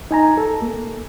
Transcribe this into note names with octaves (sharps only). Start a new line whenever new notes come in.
D#4 G#5 A#5
A4
A#3